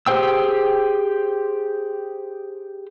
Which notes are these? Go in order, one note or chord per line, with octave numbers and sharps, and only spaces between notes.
G4 G#4 C5 G5 E6